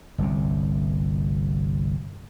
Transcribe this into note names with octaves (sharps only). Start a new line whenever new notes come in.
G1 C2 C3